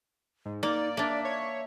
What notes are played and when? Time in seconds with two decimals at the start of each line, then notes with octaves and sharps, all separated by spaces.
0.45 G#2
0.63 A#3 D#4 D5
0.97 A#3 D4 E5
1.25 C#5